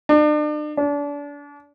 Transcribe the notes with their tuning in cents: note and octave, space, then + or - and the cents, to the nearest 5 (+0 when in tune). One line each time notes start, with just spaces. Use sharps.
D4 +40
D4 -30